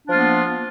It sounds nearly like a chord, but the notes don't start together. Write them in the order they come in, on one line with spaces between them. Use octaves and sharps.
D4 F3 F4 A#3 B3